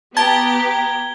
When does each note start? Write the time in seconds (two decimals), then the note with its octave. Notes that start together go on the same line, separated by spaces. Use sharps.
0.17 B3 G4 A5 A#5 G#6 G7